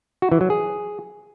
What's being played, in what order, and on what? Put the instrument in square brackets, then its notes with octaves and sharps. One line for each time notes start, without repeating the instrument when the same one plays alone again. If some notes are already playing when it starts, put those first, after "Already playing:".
[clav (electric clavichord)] F#4
E3
F#3
G#4